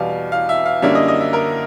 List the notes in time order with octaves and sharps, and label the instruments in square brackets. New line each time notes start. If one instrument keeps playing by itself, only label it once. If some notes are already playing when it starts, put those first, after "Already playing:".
Already playing: [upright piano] E2 B2 G3 F5
F5
E5
F5
F#2 D3 G3 A#3 C#4 E5
D#5
D#5
E5
A#4